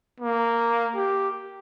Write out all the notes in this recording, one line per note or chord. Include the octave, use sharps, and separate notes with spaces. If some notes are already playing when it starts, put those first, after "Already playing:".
A#3
G4